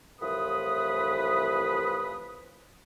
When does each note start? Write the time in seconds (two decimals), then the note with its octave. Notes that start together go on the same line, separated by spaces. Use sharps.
0.21 C2 A2 E3 F3 B4 D#6